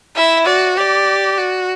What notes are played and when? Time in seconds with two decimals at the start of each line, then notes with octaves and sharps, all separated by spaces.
0.16 E4 E5
0.46 F#4 D5
0.77 G4 D5
1.38 F#4